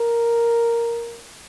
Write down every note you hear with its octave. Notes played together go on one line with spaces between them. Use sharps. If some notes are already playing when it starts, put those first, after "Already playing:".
Already playing: A#4